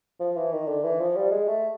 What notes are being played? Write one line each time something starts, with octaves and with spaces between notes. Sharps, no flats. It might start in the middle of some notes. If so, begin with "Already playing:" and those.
F3
E3
D#3
D3
E3
F3
G3
G#3
A3